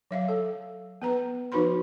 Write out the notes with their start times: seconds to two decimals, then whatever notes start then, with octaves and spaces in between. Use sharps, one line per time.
0.11 F#3 E5 F5
0.28 A4
1.02 B3 B4 A#5
1.52 F3 D#4 F#4 B4 B5 C6